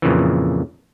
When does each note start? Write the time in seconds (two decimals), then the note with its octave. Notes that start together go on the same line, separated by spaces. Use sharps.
0.02 F2 A#2 C#3 E3